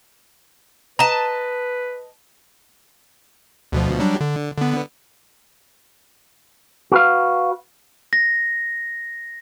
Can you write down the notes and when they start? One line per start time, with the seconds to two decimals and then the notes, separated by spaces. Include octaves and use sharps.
0.99 B4 D#5 A5 A#5
3.72 D2 B2 F3
3.99 F#3 G3 D4
4.21 D3
4.58 D3 B3
6.92 F#4 B4 F5
8.13 A#6